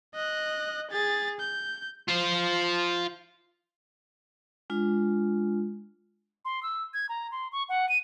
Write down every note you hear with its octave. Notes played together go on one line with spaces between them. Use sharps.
D#5 F#6
G#4 A6
G6
F4 C5
G#3 D4 F4
C6
E6
G#6
A#5
C6
C#6
F#5
D#7